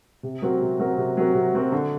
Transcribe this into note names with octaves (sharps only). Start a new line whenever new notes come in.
C3
F#3 C4 F#4 A#4
C3
F#3 C4 F#4 A#4
C3
F#3 C4 F#4 A#4
C3
F#3 C4 F#4 A#4
D3